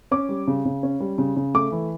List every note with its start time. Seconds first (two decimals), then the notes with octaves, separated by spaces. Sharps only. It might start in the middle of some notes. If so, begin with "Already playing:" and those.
0.11 C#4 D6
0.29 G3
0.47 C#3
0.65 C#3
0.83 C#4
1.00 G3
1.18 C#3
1.36 C#3
1.54 A3 D6
1.72 E3